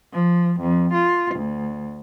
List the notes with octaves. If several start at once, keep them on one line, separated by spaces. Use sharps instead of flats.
F3
F2
F4
D2